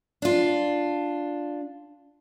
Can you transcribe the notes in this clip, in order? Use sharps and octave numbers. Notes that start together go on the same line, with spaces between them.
D4 F4